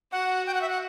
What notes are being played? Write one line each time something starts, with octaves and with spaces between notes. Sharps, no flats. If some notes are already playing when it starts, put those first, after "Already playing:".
F#4 F#5
G5
F#5
E5
F#5